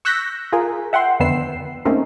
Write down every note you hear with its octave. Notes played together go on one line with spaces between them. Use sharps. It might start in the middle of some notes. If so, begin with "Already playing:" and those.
C#6 E6 F#6 G6 A#6 B6
F4 G#4 A#4
E5 F#5 G5 C6
F2 D3 D#3 B3 E6 C7
A3 A#3 C4 C#4 D#4